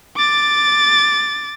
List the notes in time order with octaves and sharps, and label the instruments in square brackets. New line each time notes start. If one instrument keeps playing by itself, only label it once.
[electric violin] D6 A6